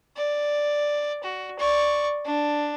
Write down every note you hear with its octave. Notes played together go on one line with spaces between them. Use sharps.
D5
F#4
D5 C#6
D4